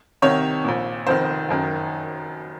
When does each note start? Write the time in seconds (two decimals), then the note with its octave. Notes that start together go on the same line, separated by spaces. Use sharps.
0.22 C2 C3 D#3 C#5
0.65 A#1 A#2
1.07 F1 F2 D#3 C5
1.49 F#1 F#2 D#3